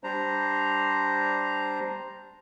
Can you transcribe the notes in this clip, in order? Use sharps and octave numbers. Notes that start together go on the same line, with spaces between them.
G3 D4 C5 A#5